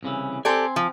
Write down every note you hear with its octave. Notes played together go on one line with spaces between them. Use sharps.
C2 C#3 E3
C4 G4 A4 C5 D5 G#5
F3